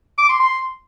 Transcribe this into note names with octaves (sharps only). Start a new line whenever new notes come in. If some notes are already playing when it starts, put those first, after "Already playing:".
D6
C6
C6